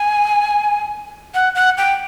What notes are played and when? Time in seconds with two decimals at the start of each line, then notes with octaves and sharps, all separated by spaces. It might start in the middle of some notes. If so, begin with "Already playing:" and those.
Already playing: G#5
1.34 F#5
1.55 F#5
1.77 G5